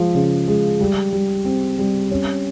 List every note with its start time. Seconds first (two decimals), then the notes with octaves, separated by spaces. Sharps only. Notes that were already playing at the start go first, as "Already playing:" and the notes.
Already playing: F3 G#3
0.15 C#3
0.48 G#3
0.81 G3
1.13 G3
1.45 C4
1.79 G3
2.11 C#4